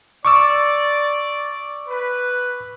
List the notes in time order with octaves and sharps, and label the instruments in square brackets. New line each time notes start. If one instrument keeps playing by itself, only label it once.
[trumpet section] D5 [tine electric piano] C#6 D6 E6
[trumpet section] B4